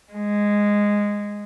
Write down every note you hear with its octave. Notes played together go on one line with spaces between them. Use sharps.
G#3